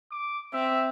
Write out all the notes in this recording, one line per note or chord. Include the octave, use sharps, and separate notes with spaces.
D6
C4 E5